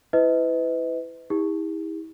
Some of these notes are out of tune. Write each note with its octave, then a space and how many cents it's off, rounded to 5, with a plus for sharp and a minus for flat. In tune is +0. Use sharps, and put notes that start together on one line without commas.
E4 +0 B4 +30 D#5 +35
E4 -40 G4 +45